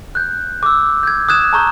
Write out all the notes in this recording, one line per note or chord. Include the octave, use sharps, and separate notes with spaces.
F#6 G6
D6 E6
G6 G#6
D#6 F#6 G#6 E7
A5 A#5 C#6 G6